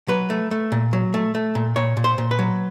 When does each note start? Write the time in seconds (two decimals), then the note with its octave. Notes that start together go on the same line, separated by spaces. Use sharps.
0.08 F#3 B4
0.30 A3
0.51 A3
0.72 A#2
0.93 F#3
1.14 A3
1.35 A3
1.55 A#2
1.76 A#2 C#5
1.97 A#2
2.04 C5
2.18 A#2
2.31 B4
2.39 F#3